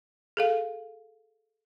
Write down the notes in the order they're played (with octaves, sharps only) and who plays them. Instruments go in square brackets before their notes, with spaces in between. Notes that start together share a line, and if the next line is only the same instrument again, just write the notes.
[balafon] G#4 A4 F5